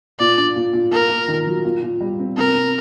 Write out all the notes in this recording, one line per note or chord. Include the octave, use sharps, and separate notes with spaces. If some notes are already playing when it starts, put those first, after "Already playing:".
A#2 D5
D4
A#2
A#2
A#3 A#4
A#3
D#3
F#3
A#2
A#2
G3
C4
C3 A#4
C3